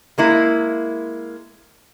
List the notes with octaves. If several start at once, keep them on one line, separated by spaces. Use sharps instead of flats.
G#3 A#3 E4